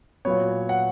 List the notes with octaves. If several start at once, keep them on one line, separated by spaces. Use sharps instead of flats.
A#2 F#3 B3 C#5
F#5